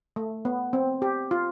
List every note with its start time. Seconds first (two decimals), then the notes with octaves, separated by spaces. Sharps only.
0.16 A3
0.45 B3
0.73 C4
1.02 G4
1.31 F4